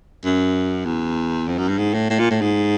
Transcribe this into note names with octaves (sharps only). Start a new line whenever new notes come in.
F#2
E2
F2
F#2
G2
G#2
A2
A2
A#2
A2
G#2